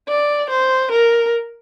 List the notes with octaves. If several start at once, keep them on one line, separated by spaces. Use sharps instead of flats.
D5
C5
A#4